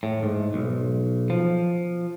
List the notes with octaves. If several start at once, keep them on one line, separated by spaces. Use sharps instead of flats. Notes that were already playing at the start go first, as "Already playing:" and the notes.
A2
G#2
B1
F3